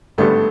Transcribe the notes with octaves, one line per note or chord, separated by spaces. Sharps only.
G#1 G2 D3 G3 A3 B3